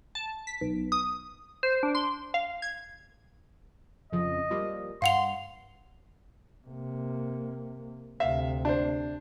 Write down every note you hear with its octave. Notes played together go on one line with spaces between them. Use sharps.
A5
B6
B1
D#6
C5
D4
C6
F5
G#6
F2 C#3 F3 D#5
F3 G3 A#3
G2 F5 F#5 C6 F7
C3 A#3
D2 C3 E5 F5
D4 C5